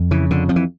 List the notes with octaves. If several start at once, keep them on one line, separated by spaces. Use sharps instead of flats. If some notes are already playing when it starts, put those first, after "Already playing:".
Already playing: F2
C#3 E3
F2 D3
F2 F3
E3